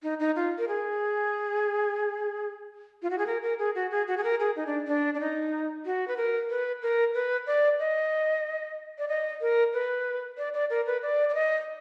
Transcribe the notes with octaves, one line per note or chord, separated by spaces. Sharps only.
D#4
D#4
F4
A#4
G#4
F4
F#4
G#4
A#4
A#4
G#4
F#4
G#4
F#4
G#4
A#4
G#4
D#4
D4
D4
D4
D#4
F#4
B4
A#4
B4
A#4
B4
D5
D#5
D5
D#5
A#4
B4
D5
D5
A#4
B4
D5
D5
D#5